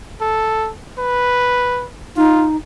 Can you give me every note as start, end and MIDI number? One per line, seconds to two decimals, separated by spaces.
0.21 0.71 69
0.99 1.87 71
2.17 2.56 63
2.17 2.47 65